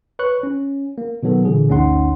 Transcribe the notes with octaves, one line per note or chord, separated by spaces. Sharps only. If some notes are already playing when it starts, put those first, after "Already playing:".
B4 C#5 C#6 F#6
C#4
A#3
B2 D#3 F#3 B3 A4
A#2 D3 E3 G#3 G#4
G1 D2 C#4 D#4 F#5 C6